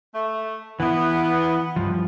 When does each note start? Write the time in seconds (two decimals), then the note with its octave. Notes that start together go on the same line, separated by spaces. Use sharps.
0.14 A3
0.80 E3 B3 E4
1.76 G2 F3